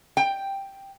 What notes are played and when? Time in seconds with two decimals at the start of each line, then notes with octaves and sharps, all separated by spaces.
0.17 G5